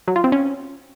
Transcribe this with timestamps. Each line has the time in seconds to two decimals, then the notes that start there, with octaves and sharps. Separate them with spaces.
0.08 F#3
0.16 F4
0.24 C4
0.32 C#4